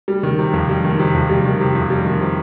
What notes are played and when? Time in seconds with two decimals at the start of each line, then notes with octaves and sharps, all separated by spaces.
0.08 G3
0.23 D#3
0.39 C3
0.53 F2
0.69 G3
0.84 D#3
0.99 C3
1.14 F2
1.29 G3
1.45 D#3
1.60 C3
1.75 F2
1.90 G3
2.06 D#3
2.21 C3